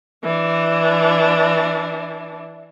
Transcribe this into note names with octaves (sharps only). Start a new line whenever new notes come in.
E3 D4